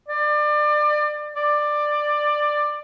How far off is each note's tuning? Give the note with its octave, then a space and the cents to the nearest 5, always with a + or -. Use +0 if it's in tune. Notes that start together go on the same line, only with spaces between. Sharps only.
D5 +30
D5 +15